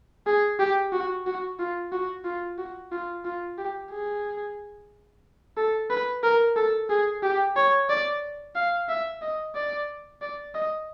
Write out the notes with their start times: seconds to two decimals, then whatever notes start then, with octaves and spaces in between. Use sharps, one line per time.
0.27 G#4
0.59 G4
0.93 F#4
1.26 F#4
1.59 F4
1.92 F#4
2.25 F4
2.58 F#4
2.92 F4
3.25 F4
3.58 G4
3.91 G#4
5.57 A4
5.90 B4
6.23 A#4
6.56 A4
6.90 G#4
7.23 G4
7.56 C#5
7.90 D5
8.56 F5
8.89 E5
9.22 D#5
9.55 D5
10.22 D5
10.55 D#5